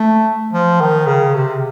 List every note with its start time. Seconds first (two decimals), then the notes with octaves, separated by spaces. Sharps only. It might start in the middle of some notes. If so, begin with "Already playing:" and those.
Already playing: A3
0.53 F3
0.81 D#3
1.07 C#3
1.34 C3